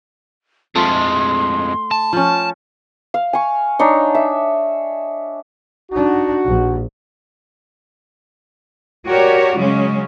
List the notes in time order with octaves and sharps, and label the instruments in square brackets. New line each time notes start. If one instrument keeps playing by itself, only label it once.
[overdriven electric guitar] F2 G#3 [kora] A3 F4 F5 [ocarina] C6
[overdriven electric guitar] A5
[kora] F3 C#4
[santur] F5
G#5 C#6
D4 D#4 C#5
E5
[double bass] D4 D#4 [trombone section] F#4
[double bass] A#1
[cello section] F#4 G4 A#4 C#5 D5
C#3 F#3 G#3 C#4